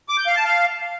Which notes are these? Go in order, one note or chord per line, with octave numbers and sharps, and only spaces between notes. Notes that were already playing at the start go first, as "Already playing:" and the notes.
D6
G6
F5
A5
F5